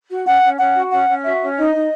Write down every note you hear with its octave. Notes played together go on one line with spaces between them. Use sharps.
F#4
C#4 F#5
C#4
C#4 F#5
F#4
C#4 F#5
C#4
F#4 E5
C#4
D#4 D#5
D#4